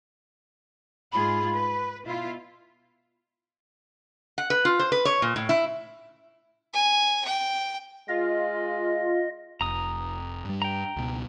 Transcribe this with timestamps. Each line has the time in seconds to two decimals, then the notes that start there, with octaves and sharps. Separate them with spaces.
1.12 G#2 F4 G#4 B5
1.54 B4
2.05 B2 E4 F4
4.38 F#5
4.50 B4
4.65 F4
4.79 C5
4.92 B4
5.05 C#5
5.22 A#2
5.36 A2
5.49 E4
6.74 G#5
7.25 G5
8.08 G#3 F4 D#5
9.61 F1 A#5 D#6
10.45 G2 G3
10.62 G5 A#5
10.96 C#2 B2